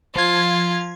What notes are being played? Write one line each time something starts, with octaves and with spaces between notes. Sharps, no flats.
F3 F4 G#6